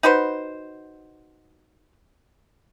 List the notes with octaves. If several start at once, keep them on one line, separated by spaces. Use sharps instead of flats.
D#4 F#4 B4 C5